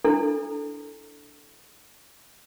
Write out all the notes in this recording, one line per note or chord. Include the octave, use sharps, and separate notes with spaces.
D4 E4 A4